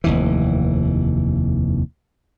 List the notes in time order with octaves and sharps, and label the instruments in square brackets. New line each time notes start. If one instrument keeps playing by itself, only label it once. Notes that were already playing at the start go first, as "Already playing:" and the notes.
[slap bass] F1 D#2 E3